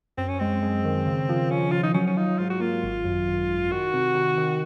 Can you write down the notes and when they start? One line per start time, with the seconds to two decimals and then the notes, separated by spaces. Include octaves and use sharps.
0.18 F#2 C4
0.29 C#4
0.39 G#3 C4
0.63 G#3
0.85 D#3
1.06 C#3
1.29 F3
1.51 F3 C#4
1.72 C#3 F4
1.83 D#4
1.94 F#3 C#4
2.07 C#4
2.17 D#4 F4
2.39 G#2 F4
2.50 F#4
2.60 A#3 F4
2.84 G#1
3.04 F#2
3.28 G#1
3.50 G#1
3.71 D#3 F#4
3.93 C3
4.15 D#3
4.38 D#3